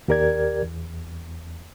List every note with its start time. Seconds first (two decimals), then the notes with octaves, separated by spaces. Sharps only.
0.08 D#2 G4 A#4 D5 G#6
0.63 E2